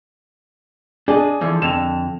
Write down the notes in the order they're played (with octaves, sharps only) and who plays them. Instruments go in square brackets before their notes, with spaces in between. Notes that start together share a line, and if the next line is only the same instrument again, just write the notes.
[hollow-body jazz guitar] D4 D#5 [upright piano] G#4
[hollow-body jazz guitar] D3 E3 F3
[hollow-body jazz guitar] F2 D3 [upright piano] E7 F7